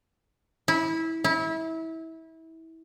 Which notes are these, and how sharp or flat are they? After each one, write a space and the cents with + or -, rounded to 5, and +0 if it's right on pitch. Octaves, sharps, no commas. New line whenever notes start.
E4 -20
E4 -25